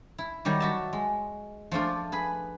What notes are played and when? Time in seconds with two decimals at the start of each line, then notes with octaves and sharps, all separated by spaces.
0.18 E4
0.45 D#3 F#3 G3 G4
0.60 F#4 E5 A5
0.93 G#3
1.71 F3 A3 D4 F4
2.12 G#4 B4 B5